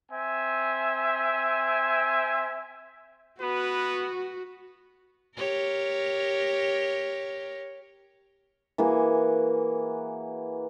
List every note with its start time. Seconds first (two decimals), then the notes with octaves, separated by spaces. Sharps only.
0.12 C4 E5 G#5
3.42 B3 F#4 B4
5.37 G4 A#4 C#5
8.78 E3 A#3 F#4 G#4